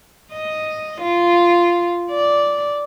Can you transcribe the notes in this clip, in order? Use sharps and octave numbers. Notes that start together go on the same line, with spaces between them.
D#5
F4
D5